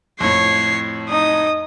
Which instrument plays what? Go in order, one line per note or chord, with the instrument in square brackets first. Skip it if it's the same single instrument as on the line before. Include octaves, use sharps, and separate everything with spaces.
[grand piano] F2 A2 [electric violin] C#5 C7
[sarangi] D#4 [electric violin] D#6